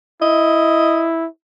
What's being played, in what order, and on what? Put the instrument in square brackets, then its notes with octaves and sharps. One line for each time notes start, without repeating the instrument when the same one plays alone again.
[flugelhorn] E4 [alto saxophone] D#5